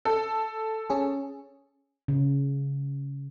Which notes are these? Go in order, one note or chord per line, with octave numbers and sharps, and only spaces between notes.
A4
C#4 G#4
C#3